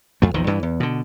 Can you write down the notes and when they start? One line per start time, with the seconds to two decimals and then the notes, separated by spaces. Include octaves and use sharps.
0.22 F2 A3
0.34 A#1 E2 D#3 F3
0.47 G2 E3
0.63 E2
0.80 B2 D3